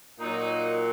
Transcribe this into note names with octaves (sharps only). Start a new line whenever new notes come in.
A#2 F#3 D#4